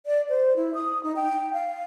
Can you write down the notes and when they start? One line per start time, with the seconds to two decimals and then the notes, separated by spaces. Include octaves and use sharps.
0.06 D5
0.29 C5
0.56 E4
0.74 D#6
1.04 D#4
1.16 G5
1.53 F5